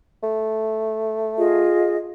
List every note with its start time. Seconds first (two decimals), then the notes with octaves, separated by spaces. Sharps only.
0.23 A3
1.37 F4 G#4 D#5